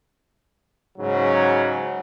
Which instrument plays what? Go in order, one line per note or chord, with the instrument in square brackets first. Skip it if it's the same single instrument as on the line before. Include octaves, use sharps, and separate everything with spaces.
[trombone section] G#2 C#3 F#3